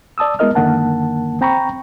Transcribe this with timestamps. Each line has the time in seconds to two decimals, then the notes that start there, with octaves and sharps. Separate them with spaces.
0.18 D5 A5 D#6 E6
0.39 G#3 B3 E4 A#4 D#5 F6
0.55 F#2 D3 D#3 A#3 F#5 A5
1.41 C4 G5 A#5 B5 C#6